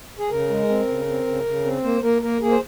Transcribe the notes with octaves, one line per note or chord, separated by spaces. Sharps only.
G#4
C#3 A#4
G#3
C4
C#3
C4
C#3
C#3
C4
A#3 C5
A#3 A#4
A#3 A#4
A#3 G#4
C5